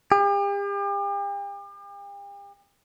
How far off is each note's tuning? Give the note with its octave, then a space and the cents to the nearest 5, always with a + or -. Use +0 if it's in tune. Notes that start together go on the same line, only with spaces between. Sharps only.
G4 +40